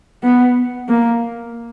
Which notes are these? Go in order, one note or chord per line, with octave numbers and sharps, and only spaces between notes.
B3
A#3